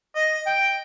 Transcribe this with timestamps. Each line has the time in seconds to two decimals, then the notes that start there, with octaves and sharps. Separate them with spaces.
0.16 D#5
0.46 G5